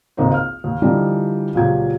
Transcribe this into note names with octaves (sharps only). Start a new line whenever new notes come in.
G#1 C#2 A#3 D#4 C5
F6
D#2
D3 E3 F3 G3 D4 D#4
C#2 A#2 F3 F#3 G4 G#6